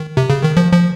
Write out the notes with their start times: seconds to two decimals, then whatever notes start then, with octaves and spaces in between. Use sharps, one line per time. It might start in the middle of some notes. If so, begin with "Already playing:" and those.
Already playing: D#3
0.17 C3
0.30 C#3
0.43 D#3
0.57 F3
0.73 F3